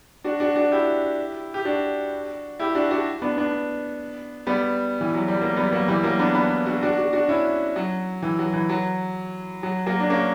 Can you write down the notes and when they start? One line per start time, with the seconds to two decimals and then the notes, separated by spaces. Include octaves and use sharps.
0.24 D4 F#4
0.40 D4 F#4
0.56 D4 F#4
0.72 E4 G4
1.54 G4
1.65 D4 F#4
2.60 E4 G4
2.75 D4 F#4
2.91 D4 F#4
3.22 B3 D4
3.37 B3 D4
4.47 G3 B3
5.01 E3
5.14 F#3
5.28 G3
5.41 F#3 A#3
5.57 G3 B3
5.72 F#3 A#3
5.88 E3 G3
6.03 F#3 A#3
6.19 B3 D4
6.35 B3 D4
6.66 D4 F#4
6.82 D4 F#4
6.97 D4 F#4
7.13 D4 F#4
7.29 C#4 E4
7.76 F#3
8.23 E3
8.39 F#3
8.53 E3
8.70 F#3
9.63 F#3
9.86 F#3 A#3
10.00 D4
10.10 A#3 C#4